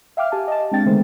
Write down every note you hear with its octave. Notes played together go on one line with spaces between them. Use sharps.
E5 F5 G5 D6 F6
G4 G#5 A5
D#5 A5
G#3 C4 D4 G5 A6
D3 D#3 G#3 A3 B3 C5